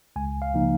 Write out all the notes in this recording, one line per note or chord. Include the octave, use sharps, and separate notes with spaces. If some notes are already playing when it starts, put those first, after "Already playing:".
C#2 G#5
F5
C#3 F3 A#3 D#4